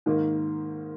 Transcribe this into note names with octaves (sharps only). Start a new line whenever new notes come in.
G#2 D#3 A#3